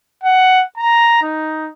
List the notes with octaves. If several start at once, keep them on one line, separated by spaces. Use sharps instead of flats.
F#5
A#5
D#4